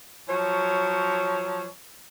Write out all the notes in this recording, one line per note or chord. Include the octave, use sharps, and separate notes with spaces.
F3 F#3 C#5